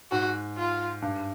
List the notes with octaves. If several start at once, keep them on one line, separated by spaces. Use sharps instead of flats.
G#2 F#4
F4
G2